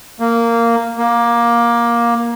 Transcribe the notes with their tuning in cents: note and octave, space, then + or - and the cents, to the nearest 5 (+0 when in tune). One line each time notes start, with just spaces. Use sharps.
A#3 -10
A#3 +15